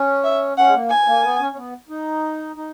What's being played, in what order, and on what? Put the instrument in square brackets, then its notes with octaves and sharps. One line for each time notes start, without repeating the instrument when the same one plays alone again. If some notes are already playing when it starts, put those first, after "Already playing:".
Already playing: [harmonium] C#4
[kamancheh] E5
[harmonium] C#4 [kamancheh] F#5
[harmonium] G#3
A#3
[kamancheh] G#5
[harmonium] A#3
B3
C#4
C#4
B3
D#4
D#4